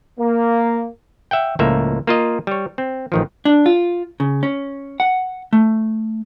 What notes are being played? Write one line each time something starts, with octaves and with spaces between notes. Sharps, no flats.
A#3
E5 F#5 G5
C#2 A2 F3 A#3 E5
A#3 F4 D#5
G3 C#5
C4
A1 D#3 F3
D4
F4
C#3
C#4
F#5
A3